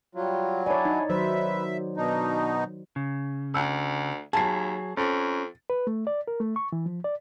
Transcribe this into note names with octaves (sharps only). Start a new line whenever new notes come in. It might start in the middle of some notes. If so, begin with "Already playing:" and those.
F#3 G3 F4
D4 E4 C#5 D5 G#5
D#4
D#3 F#3 B4 C5 E5
B2 D4 D#4
C#3
D2 E6
D#2 F#3 G#4 A5 C7
F2 C#4 A6
B4
A3
D5
A#4
A3
C#6
E3
F3
D5